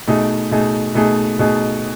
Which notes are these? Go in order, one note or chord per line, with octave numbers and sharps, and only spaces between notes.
B2 A3 D#4 G#4
B2 A3 D#4 G#4
B2 A3 D#4 G#4
B2 A3 D#4 G#4